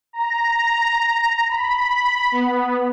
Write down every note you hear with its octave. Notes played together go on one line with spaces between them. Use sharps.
A#5
B5
B3